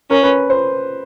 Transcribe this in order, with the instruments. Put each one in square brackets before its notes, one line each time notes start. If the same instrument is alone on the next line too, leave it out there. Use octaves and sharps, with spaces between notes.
[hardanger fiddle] C#4 [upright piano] A#4
[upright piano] B4
C5